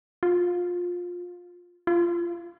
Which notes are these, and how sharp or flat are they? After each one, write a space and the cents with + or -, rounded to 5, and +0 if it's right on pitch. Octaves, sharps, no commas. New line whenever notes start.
F4 +20
F4 -20